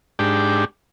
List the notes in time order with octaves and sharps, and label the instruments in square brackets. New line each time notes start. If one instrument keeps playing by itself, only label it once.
[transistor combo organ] G#2 D4 G4